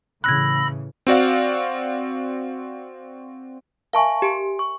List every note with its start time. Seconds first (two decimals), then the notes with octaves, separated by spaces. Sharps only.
0.24 A2 C#3 E3 B5 E6 F#6 G#6 A#6
1.07 C4 F#4 D5 F5
3.93 A#4 E5 F5 G#5 A5 C#6
4.22 G4 D7
4.59 C#6